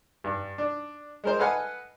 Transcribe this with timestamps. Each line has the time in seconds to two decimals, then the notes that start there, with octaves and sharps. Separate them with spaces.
0.24 G2
0.58 D4
1.24 G#3 A#4 C5
1.39 A4 B4 D#5 F5 F#5 G#5